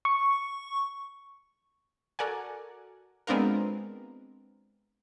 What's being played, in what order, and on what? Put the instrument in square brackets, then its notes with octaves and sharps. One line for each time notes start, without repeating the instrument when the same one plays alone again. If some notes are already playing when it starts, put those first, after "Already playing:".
[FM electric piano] C#6
[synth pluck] F#4 A4 A#4 D5 F#5 G#5
G#3 B3 C4 D4 F4 A#4